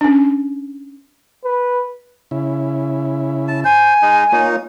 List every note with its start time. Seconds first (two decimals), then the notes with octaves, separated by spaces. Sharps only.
0.01 C#4 D4
1.45 B4
2.31 C#3 E4
3.48 A5
3.65 C5 G#5
4.02 G#3 D#4
4.32 A#3 D#4 F4 C#5